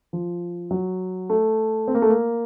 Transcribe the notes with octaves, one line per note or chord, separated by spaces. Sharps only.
F3
F#3
A3
C4
A#3
A3
A#3